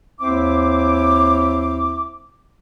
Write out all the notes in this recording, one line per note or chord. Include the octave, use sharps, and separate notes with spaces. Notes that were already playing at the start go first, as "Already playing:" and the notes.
D#2 C4 E4 C5 E5 D6